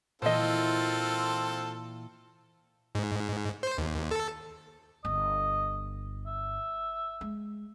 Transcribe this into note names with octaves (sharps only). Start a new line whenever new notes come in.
A#2 E3 C4 F4 A4 C5 D#5
G#2
C5
D#2
A4
G1 D#5
E5
G#3